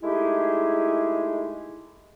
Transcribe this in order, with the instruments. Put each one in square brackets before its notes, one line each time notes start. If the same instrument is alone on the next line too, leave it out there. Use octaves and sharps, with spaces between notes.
[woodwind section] G#3 A3 D#4 E4 G4 G#4